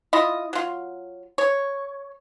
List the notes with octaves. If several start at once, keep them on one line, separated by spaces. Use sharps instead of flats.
E4 F4 D#5
F#3 F4
C#5